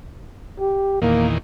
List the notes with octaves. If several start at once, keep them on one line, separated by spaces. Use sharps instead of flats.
G4
E2 A#2 D#3 A#3